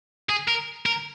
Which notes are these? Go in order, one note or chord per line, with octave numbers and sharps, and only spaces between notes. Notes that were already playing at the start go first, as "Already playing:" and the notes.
G#4
A#4
A#4